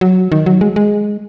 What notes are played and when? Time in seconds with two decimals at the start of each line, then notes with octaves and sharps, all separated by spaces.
0.01 F#3
0.32 D#3
0.46 F#3
0.61 G#3
0.76 G#3